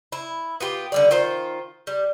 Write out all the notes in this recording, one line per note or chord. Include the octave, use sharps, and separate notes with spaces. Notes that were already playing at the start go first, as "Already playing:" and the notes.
E4
B3 F4 G4
D3 G3 D5
D#3 F4 C5
G3